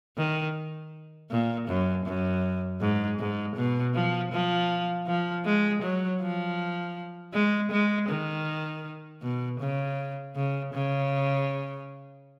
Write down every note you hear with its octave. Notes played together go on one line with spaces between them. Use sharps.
D#3
A#2
F#2
F#2
G#2
G#2
B2
F3
F3
F3
G#3
F#3
F3
G#3
G#3
D#3
B2
C#3
C#3
C#3